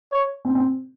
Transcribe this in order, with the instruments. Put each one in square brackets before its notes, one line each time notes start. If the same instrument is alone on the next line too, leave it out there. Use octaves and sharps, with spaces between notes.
[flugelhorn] C#5
[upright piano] C4
C4